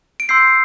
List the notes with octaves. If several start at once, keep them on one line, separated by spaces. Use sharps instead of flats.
D7
C6 E6 G6 C7